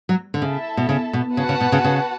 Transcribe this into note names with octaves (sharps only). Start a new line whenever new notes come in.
F#3
D3
C#3 E4 A4 E5 A5
B2
C#3
B2
C#3 F#4 B4 F#5 A5
C#3
B2
C#3
C#3